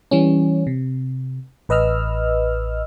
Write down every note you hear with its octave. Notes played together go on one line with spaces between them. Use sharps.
E3 G3 C#4
C3
A1 B4 D#5 E6 F6